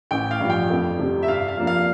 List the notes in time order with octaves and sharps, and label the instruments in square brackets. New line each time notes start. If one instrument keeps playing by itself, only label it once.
[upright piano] A1 [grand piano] G5
[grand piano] F5
[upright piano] G2 F3
[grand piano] G5
[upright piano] F2
C3 G3
[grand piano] E5
[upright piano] G2 [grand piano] F5
[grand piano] F5
[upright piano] F3 A#3 D4
[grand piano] F5